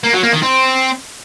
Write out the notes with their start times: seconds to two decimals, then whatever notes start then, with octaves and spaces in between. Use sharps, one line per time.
0.03 A#3
0.13 F#3
0.23 A#3
0.32 D#3
0.42 C4